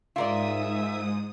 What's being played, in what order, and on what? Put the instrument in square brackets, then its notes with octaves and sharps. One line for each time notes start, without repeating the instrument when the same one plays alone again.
[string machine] G#2 D#6 [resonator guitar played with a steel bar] F4 A#4 D5 [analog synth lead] E5